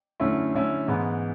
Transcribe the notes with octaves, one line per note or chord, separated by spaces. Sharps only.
F#2 D3 A3 C#4 E4
F#2 D3 A3 C#4 E4
G#2 E3 G#3 B3